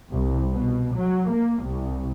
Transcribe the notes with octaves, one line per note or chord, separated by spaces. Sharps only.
C2
B2
F#3
A#3
C2